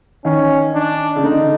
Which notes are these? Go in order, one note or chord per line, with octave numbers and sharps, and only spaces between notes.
D#3 C#4
D4
C#3
D3 D#4